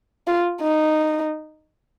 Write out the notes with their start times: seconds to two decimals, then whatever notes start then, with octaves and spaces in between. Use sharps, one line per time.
0.27 F4
0.62 D#4